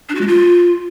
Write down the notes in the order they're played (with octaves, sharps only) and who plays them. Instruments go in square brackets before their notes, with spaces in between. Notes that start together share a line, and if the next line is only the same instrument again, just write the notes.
[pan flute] D4
F#4
G#3
F4